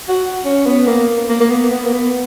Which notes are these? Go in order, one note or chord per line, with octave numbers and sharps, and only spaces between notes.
F#4
C#4
B3
A#3
A#3
A#3
B3
B3
A#3
B3